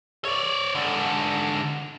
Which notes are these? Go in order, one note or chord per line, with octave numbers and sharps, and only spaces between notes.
C#5 D5
G#2 D3